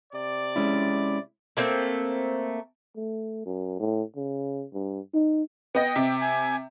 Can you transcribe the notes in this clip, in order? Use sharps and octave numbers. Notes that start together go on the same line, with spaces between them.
C3 D5
G#3 C#4 E4
A3 A#3 C4
A3
F#2
A2
C#3
G2
D#4
B3 D#5 G5
C3
G#5